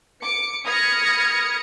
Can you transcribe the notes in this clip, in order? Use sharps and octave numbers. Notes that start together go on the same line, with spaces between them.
D6 C#7
B5 D#6 F6 G#6 A#6 C#7